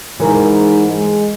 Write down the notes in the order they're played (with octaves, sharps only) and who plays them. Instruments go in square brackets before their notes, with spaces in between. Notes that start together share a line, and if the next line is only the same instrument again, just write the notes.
[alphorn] G#2 [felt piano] E3 [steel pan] A#4 C#5
[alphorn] G#3